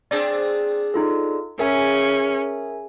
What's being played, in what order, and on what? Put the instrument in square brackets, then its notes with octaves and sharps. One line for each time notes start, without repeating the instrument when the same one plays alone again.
[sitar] C4 D4 G#4 [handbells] D5
[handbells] D#4 F4 A4
[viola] C#4 [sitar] G#4 [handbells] A#4 E5 G#5